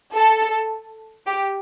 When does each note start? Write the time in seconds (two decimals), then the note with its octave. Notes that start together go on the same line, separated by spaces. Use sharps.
0.15 A4
1.26 G4